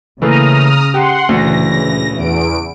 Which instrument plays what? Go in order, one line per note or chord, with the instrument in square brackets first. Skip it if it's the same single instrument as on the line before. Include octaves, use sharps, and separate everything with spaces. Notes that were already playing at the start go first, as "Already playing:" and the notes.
[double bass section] C#3 [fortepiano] E3 A3 A#3 [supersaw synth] A#5 D#6 F6
[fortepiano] G4 [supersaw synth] F#5 C6
[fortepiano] D2 [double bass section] A#2 C#3 E3 [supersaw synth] A#6
[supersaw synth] E2 D7